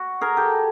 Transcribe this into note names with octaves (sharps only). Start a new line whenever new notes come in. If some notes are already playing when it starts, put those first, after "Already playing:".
Already playing: F#4
G#4 A#4
G4 A4